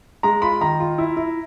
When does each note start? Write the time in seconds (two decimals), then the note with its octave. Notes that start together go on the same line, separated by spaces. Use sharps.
0.23 G#3 A#5
0.42 F4 B5
0.61 D#3 A#5
0.80 F4
0.98 E4
1.16 E4